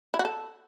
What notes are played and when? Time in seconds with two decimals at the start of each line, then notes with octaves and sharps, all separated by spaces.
0.14 E4
0.19 F#4
0.25 A4